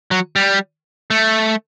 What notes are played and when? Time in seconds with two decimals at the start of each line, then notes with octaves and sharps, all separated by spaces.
0.11 F#3
0.36 G3
1.10 A3